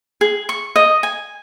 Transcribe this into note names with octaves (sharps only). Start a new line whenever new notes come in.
G#4
C#6
D#5
G#5